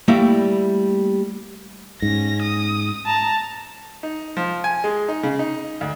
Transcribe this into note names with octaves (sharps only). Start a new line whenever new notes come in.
G3 A3 A#3 E4
G#2 C#4 A#6
D#6
A5 A#5
D#4
F3
G#5
G#3
D#4
C#3
D#4
D2